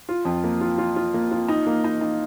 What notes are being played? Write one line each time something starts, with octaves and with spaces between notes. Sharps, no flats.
F4
F2
A#3
F4
F4
F4
A#3
F4
D#4
A#3
D#4
D#4